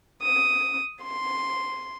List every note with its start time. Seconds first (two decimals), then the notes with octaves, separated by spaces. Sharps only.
0.22 D#6
1.02 C6